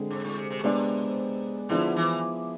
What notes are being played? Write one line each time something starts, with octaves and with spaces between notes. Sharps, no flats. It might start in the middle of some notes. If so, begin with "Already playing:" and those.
Already playing: D3 G#3 C4 G#4
G#2
A2
C3
C3
B2
C3 G#3 B3 D4 G#4 D5
D3 F3 B3 E4 G#4
E3